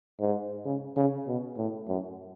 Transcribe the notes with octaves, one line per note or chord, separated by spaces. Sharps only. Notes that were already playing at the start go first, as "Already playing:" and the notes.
G#2
C#3
C#3
B2
A2
F#2